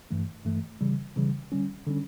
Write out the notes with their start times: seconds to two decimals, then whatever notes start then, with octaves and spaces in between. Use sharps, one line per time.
0.11 G2 E3 A3
0.45 G2 E3 A3
0.81 C#3 E3 G3
1.16 C#3 E3 G3
1.52 D3 G3 C#4
1.86 D3 G3 C#4